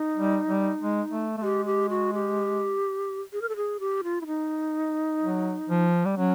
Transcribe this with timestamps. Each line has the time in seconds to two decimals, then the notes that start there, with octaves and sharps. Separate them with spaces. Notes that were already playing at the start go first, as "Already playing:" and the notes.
Already playing: D#4
0.16 G3
0.48 G3
0.80 G#3
1.11 A3
1.37 A3
1.42 G#3 G4
1.66 G4
1.90 F#4
2.14 G4
3.33 G#4
3.42 A#4
3.49 A4
3.56 G#4
3.80 G4
4.04 F4
4.21 E4
4.27 D#4
5.22 F#3
5.69 F3
6.05 G3
6.16 F#3 C#4